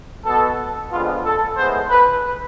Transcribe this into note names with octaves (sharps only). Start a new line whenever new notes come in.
B2 B3 A4
F2 D3 G#3 B3 F4
A4
A2 E3 G#3 B3 C5
B4